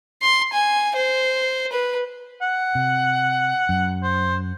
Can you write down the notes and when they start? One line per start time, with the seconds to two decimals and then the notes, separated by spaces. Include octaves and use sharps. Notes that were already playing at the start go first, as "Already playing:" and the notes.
0.22 C6
0.53 G#5
0.96 C5
1.72 B4
2.42 F#5
2.75 C3
3.69 F#2
4.03 C5